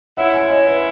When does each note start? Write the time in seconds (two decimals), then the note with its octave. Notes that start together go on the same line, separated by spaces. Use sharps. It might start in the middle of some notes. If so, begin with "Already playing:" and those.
0.17 G#3 C#4 E4 E5 F#5
0.34 F#5 G#5
0.50 C#5 D#5
0.67 B4 C#5